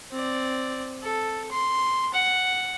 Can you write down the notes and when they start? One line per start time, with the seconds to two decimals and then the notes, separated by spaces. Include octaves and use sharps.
0.11 C4 D5
1.02 A4
1.51 C6
2.13 F#5